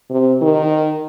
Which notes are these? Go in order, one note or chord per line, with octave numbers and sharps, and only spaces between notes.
C3
D#3